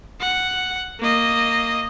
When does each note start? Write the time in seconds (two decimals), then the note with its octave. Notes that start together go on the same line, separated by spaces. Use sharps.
0.21 F#5
1.00 A#3 D#5